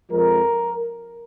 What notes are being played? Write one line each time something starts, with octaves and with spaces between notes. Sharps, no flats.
F2 F3 G#3 A#4